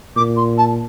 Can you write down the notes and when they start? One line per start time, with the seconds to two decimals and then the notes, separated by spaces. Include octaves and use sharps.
0.16 A#2 D6
0.37 C6
0.58 A5